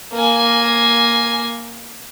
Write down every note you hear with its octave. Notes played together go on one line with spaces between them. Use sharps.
A#3 G#5